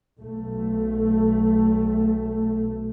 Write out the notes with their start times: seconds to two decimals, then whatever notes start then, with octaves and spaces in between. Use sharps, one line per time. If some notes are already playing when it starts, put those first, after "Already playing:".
0.20 B1 A3